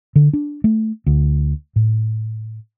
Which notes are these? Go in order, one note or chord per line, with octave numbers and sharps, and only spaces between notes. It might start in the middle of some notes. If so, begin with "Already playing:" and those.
D3
D4
A3
D2
A2